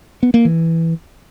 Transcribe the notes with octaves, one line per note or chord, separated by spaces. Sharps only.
B3
A#3
E3